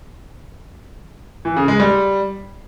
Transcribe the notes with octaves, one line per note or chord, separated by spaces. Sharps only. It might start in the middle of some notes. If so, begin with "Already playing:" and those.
E3
C#3
G#3
G3